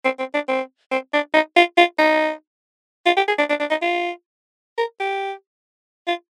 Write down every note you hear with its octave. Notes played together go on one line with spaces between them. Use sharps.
C4
C4
D4
C4
C4
D4
D#4
F4
F4
D#4
F4
G4
G#4
D4
D4
D4
D#4
F4
A#4
G4
F4